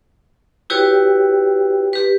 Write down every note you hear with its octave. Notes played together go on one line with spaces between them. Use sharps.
E4 F#4 G4 B4 C#5 G5
G4 B4